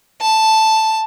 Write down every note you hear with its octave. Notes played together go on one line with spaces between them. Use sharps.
A5